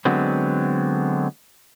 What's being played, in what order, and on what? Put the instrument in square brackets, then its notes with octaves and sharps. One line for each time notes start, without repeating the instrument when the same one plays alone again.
[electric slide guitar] D3 F#3 G#3 B3 C4